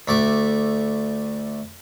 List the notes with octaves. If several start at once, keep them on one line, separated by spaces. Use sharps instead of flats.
D2 A3 D5 E5